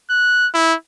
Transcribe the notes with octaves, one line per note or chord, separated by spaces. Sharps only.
F#6
E4